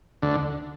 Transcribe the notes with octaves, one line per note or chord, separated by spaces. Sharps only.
D2 D3